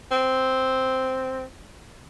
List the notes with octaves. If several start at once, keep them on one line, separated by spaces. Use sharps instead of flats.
C4